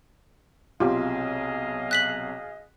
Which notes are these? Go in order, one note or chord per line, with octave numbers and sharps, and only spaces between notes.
B1 C3 F4 G4 G#4 D#5 F5
F#6 B6 F#7